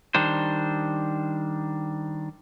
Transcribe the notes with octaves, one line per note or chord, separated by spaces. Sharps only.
D#3 G3 D4 C5